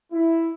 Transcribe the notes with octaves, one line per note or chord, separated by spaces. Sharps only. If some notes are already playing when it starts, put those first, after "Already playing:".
E4